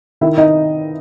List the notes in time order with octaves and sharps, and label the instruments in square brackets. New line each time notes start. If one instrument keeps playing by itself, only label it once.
[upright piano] D#3 E4 E5
D#4 D#5